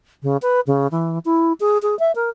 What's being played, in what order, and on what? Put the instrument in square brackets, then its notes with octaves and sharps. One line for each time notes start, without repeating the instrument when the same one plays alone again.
[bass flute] C#3
B4
C#3
E3
E4
G#4
G#4
E5
A#4